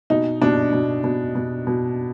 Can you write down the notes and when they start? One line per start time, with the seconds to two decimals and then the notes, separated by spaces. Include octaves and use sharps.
0.10 B2 D#4
0.42 B2 D4
0.72 B2
1.04 B2
1.35 B2
1.67 B2